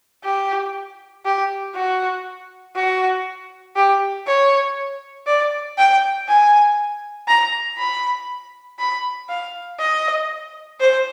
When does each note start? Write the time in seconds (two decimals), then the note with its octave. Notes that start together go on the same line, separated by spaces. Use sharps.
0.24 G4
1.25 G4
1.75 F#4
2.76 F#4
3.76 G4
4.27 C#5
5.27 D5
5.78 G5
6.28 G#5
7.28 A#5
7.78 B5
8.79 B5
9.29 F5
9.80 D#5
10.80 C5